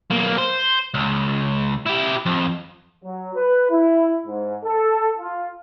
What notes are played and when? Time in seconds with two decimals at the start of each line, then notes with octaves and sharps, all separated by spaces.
0.10 B1 A#3
0.38 C5
0.94 C#2
1.86 E4 G4
2.26 F2
3.04 F#3
3.35 B4
3.70 E4
4.26 G#2
4.64 A4
5.18 F4